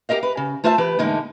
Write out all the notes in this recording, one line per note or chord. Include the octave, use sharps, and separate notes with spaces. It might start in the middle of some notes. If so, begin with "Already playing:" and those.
G4 A#4 D#5 F5
B4
C#3
A3 F4 C5 E5 F#5 A5
E3 G4 B4
E2 A2 D3 G#3 A#3 D#4